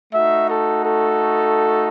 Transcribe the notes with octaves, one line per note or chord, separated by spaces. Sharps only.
A3 D#4 F#4 E5
A4
A4